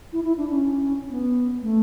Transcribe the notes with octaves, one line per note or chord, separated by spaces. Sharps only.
E4
E4
D4
C#4
C#4
B3
A3